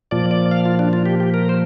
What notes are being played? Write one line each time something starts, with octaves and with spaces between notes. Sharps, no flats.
A#2 F3 D5
D5
F5
F4
D4
F4
G4
G4
A#4
C5